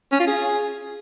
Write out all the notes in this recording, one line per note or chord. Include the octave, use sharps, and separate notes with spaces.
C#4
F4
G#4